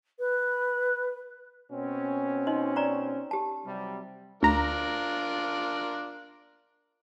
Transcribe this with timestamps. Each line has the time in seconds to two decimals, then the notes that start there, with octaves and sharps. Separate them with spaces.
0.19 B4
1.71 B2 C4 C#4
2.47 D#4 D#5 C6
2.76 D5 A#5 C#6
3.31 G4 A5
3.65 C3 F#3 G3
4.43 D2 D4 F4 A#4 A#5